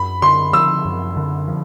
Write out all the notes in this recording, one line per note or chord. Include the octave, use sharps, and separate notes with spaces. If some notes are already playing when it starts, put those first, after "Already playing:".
Already playing: F#2 B5
D3 C6
F3 E6
F#2
D3
F3